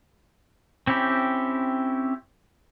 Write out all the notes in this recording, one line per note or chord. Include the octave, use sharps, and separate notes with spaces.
C4 C#4 E4 G4